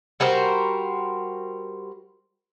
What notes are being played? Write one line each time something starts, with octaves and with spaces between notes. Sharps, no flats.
G3 F#4 A#4 C5